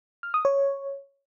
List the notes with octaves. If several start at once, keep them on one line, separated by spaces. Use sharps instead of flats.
F6
D#6
C#5